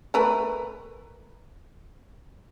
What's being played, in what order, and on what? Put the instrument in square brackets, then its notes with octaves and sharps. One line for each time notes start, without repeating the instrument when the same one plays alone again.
[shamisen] A3 A#4 B4